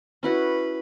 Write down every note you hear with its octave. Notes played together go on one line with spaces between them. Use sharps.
C#4 E4 F#4 B4